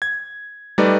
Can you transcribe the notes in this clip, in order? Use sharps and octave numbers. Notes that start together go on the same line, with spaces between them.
G#6
G3 A3 D#4 B4 D5